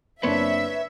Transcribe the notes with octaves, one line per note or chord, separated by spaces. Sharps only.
F#1 C4 D4 B4 C#5 E5